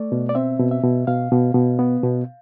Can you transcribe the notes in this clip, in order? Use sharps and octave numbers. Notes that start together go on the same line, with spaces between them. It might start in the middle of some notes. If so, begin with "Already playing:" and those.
Already playing: A3 D5
B2
D5
C4 E5
B2
E5
B2
B2 F5
B2
B2
B3
B2